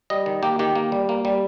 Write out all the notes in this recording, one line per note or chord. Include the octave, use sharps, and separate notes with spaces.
G3 D#5
D#3
A#3 G4
D#3 G4
A#3
G3
A#3
G3